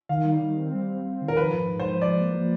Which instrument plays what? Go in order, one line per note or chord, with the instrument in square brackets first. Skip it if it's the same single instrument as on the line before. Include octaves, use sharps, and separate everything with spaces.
[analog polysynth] D#3 [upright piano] F5
[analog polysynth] G3
D#3
C4
G3
C4
C4
D#3
[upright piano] A#4
[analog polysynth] F3 [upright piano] B4
[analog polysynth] G#2
G#2
[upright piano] C5
[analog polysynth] F3
[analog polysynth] G#2 [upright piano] D5
[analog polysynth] A#3
F3